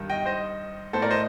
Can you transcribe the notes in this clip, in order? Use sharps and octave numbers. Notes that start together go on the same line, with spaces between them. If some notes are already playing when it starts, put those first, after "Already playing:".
Already playing: G2 D#3
D#5 G5
C5 D#5
A2 A4 C5
A#4 D5
C5 D#5